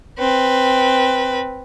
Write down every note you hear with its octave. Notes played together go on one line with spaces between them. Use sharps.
C4 B4